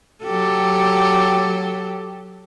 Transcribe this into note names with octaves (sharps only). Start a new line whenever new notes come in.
F#3 G4 A4